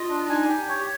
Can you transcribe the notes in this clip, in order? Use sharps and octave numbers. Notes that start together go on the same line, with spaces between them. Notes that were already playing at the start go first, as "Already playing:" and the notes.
Already playing: F4 D#5
D4
D#4 G#5
G4
C#5